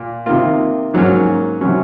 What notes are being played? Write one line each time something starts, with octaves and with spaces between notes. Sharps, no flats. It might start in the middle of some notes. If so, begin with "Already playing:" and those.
Already playing: A#2
C3 D#3 A#3 F4
G#2 F#3 A#3 C#4
C3 F#3 C#4